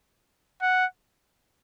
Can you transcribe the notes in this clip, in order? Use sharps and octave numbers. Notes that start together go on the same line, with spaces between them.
F#5